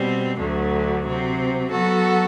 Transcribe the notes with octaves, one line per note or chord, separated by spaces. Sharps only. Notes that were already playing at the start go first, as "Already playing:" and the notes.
Already playing: B2 G3 C4
D2 D3 F#3 A3
C3 F#3 C4
F#3 B3 F#4 A4